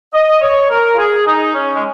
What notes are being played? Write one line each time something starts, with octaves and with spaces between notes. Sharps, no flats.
D#5
C#5
A#4
F4
G#4
D#4
C#4
G#3